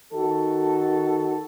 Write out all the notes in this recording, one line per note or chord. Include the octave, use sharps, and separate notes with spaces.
D#3 F#4 A4